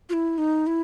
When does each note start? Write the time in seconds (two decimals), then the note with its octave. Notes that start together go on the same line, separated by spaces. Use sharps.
0.09 F4
0.13 E4
0.38 D#4
0.67 E4